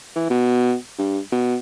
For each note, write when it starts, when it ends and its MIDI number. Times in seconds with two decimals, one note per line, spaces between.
0.16 0.27 52
0.30 0.75 47
0.99 1.19 43
1.32 1.57 47